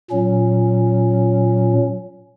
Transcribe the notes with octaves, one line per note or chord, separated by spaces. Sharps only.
A#2 F#3 C#4